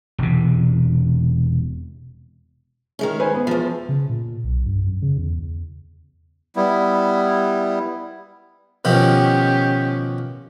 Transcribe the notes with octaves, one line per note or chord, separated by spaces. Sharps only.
E1 C3
D#3 G#3 C#4
B4 C5 G#5
B3
E2 F3
C#3
A#2
B1
G2
F#2
C#3
E2
G3 B3 E4
B2 D#3 F3 C#4 G4